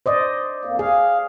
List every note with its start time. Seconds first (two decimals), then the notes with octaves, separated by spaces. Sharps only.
0.06 C5 D5 D#5
0.65 F2 A#3
0.79 G#4 F5